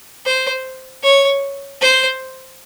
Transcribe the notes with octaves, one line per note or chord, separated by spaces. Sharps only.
C5
C#5
C5